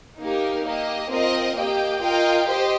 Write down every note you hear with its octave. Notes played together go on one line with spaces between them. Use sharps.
A#3 D#4 G4 A#4
A#3 G4 D#5
C4 F4 A#4 D#5
A#3 G4 D#5 G5
F4 A#4 D#5 G5
G4 C5 D#5